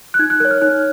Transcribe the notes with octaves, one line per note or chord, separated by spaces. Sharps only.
F#6
D#4 G#6
F#6
A#4 C#5 F#6
F6
D#4 F#6